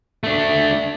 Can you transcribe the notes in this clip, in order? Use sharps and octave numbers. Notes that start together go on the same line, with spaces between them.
A3 D4